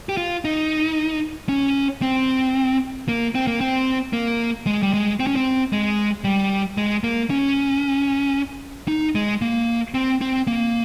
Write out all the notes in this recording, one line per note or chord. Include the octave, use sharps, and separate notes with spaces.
G4
F4
D#4
C#4
C4
A#3
C4
A#3
C4
A#3
G#3
G3
G#3
C4
C#4
C4
G#3
G3
G#3
A#3
C#4
D#4
G#3
A#3
C4
C4
A#3